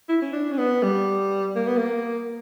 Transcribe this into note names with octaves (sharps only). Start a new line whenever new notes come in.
E4
C#4
D4
C#4
B3
G3
A#3
B3
A#3